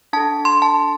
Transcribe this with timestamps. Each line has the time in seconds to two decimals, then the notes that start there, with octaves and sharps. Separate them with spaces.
0.13 D4 A4 A5
0.45 C6
0.62 A5